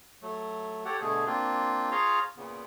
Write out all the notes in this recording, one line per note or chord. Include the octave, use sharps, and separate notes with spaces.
F#3 A3
G4 A4 C#5 F#5
B2 D3 A3 G#4
A#3 C4 D4 F4
F4 G#4 C#5 F5 A#5 C6
A#2 C#3 B3